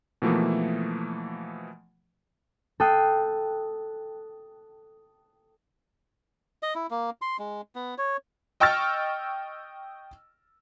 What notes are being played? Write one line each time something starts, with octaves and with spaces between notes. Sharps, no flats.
B2 E3 F3 A3 A#3
A4 G5 D#6 F#6 C7
D#5
E4
A#3
C6
G#3
B3
C#5
D#5 G5 C#6 E6 F6 A6